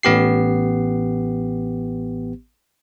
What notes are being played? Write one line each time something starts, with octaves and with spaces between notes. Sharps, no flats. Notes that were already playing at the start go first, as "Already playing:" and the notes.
A1 B3 G4 C7